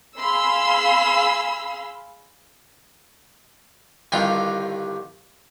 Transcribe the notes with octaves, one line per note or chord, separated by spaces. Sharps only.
G#4 F5 B5 C6 E6
C2 G2 D3 D#3 F4 G5